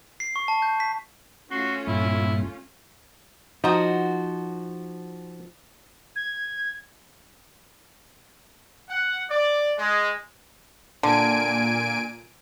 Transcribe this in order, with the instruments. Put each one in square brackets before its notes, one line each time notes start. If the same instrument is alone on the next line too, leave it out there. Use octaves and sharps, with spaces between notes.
[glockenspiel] C7
C#6
A5
G6
B6
[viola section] A3 C#4 F4 [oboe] F#4 [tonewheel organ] C6
[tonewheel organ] G2 A#2 [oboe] E4
[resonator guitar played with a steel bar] F3 F#4 [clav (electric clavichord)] D#4
[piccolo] G#6
[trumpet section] F#5
D5
G#3
[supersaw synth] A#2 G#5 D7 [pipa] D3